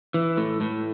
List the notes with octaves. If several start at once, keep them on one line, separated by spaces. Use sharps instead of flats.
E3
A2
A2